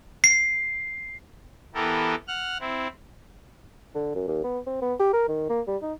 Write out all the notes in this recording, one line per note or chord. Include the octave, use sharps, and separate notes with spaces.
C7
E3 B3 G4 A4 A#4
F#5 F6 F#6
C4 E4
D3
F#2
D#2
B3
C4
B3
G4
A#4
D#3
A#3
G3
D#4